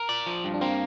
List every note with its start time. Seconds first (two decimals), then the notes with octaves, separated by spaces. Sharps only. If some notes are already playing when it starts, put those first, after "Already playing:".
Already playing: A#4
0.09 D5
0.26 F3
0.44 G2
0.54 D4
0.61 A#3 C4